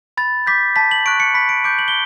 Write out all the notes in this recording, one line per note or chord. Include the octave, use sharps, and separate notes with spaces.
B5 A6
D6 G6 B6
A5 B6
F#7
C#6 F#6 D7
C#7
B5 B6
D7
D6 G6 D7
F#7
G7